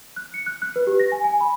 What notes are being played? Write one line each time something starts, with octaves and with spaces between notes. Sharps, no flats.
F#6
C#7
F#6
F#6
B4
G4
A#6
G#5
G#5
B5